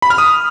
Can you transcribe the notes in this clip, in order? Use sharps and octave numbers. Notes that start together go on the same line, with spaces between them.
B5
F6
D#6